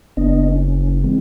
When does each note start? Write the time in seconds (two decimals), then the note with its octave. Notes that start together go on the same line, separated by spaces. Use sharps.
0.17 F#1 B3 D4 D#5
0.51 C#4
1.04 E3 G#3 C4